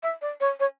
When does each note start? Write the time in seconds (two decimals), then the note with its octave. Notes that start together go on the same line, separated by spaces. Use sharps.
0.03 E5
0.21 D5
0.40 C#5
0.60 C#5